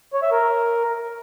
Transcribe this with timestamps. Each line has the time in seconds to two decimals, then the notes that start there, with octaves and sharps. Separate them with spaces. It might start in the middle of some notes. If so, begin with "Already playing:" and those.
0.14 C#5
0.23 E5
0.32 A#4